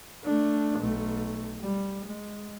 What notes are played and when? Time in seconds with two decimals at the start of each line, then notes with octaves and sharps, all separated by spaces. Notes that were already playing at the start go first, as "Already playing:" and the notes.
0.24 A3 D4
0.79 B1 A3
1.61 G3
2.05 G#3